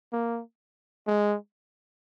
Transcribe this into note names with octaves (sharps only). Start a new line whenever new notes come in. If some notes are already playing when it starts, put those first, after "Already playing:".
A#3
G#3